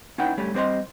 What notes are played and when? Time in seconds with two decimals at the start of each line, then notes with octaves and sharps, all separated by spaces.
0.18 C#4 D#4 E4 B4 F#5 G5
0.37 G2 G3 A3 C#4
0.54 G3 C4 C5 D#5 C6